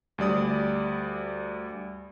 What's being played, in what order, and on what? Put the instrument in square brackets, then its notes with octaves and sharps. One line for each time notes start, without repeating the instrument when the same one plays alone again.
[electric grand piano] D2 G3 D5 D#6